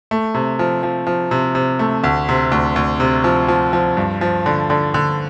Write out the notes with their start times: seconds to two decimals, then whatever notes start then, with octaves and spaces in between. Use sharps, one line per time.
0.11 A3
0.34 C3
0.59 F3
0.83 F3
1.07 F3
1.31 C3
1.55 C3
1.79 A3
2.04 D2
2.29 C3
2.52 D2
2.76 D2
3.00 C3
3.24 F3
3.48 F3
3.73 F3
3.97 G2
4.21 F3
4.46 D3
4.70 D3
4.94 D3